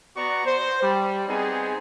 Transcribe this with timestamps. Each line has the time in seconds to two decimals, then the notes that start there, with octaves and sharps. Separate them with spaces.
0.17 B3 F#4 D5 A#5 C#6
0.46 C5
0.82 G3
1.28 B3 C4 D#4 G#4